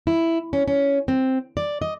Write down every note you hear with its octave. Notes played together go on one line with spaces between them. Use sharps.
E4
C#4
C#4
C4
D5
D#5